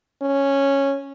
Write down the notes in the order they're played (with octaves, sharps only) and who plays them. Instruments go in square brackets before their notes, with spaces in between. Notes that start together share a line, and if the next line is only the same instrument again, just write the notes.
[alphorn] C#4